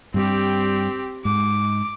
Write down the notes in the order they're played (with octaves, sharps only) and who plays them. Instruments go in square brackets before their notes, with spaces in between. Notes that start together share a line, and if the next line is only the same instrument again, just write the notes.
[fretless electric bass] G2 G3 [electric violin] C4 G4
[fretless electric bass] G#2 [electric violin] D6